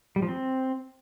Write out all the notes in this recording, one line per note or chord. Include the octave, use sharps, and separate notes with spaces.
G3
F3
C4